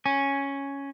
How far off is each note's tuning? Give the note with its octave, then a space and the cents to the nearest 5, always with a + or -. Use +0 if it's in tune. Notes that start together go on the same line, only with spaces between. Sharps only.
C#4 +0 G#5 +0